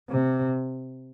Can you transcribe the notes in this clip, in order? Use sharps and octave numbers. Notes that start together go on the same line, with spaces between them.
C3